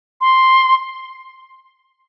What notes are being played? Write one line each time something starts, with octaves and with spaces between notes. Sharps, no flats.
C6